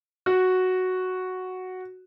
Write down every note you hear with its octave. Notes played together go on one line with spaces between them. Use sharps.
F#4